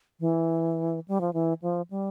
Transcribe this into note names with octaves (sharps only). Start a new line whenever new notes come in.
E3
G3
F3
E3
F3
G3